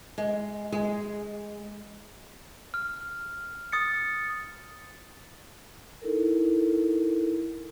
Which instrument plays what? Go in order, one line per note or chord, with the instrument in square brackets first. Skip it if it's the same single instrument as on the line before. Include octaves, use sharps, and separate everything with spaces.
[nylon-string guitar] G#3
G#3
[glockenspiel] F6
D#6 A6 C#7
[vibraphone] D#4 E4 A4 A#4